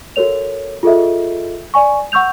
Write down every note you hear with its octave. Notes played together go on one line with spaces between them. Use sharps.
F#4 A4 A#4 C#5 F7
F4 G#4 A4 D#5 E5
D5 G#5 C#6
F#5 C#6 E6 G6 F7